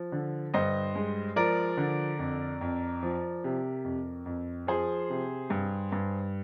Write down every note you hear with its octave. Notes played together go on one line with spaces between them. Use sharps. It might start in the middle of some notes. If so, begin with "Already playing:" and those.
Already playing: F3
D3
G2 C5 D#5
G#3
F3 A#4 D5
D3
F2
F2
F3
C3
F2
F2
F3 G#4 C5
C3
G2
G2